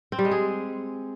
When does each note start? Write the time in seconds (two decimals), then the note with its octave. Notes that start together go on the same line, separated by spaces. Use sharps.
0.12 C4
0.19 G3
0.25 G#3
0.31 G#4